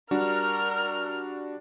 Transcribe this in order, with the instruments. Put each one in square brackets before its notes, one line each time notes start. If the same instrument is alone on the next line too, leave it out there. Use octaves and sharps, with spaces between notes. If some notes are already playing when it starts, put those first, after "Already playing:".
[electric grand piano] G3 D4 F#4 [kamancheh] A#4 F6